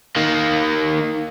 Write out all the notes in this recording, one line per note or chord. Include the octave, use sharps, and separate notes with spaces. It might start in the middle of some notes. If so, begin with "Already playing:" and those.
D#3 A#3